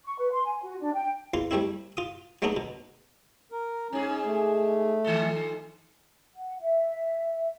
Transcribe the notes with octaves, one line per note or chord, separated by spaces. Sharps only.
C#6
B4
C6
G#5
F#4
D4
G5
E2 F4 C6
G3 A3 C4 E4
F4 D#6
F#3 G#3 A3 B3 D4 D#4
B2
A#4
G#2 C#4 G#4
A3
D#3 F3 A4
F#5
E5